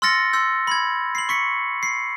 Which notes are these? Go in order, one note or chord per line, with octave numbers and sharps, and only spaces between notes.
C6 E6 F6 A6 A#6 C#7
C6 E6 G6
B5 G#6
C7 F#7
C#6 B6 C#7
C7